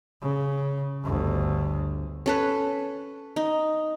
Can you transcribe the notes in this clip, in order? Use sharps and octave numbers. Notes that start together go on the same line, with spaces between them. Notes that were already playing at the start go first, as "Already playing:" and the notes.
C#3
G1 D2
C#4 A4 B4
D#4